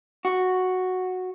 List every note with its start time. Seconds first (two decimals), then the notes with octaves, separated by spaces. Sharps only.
0.25 F#4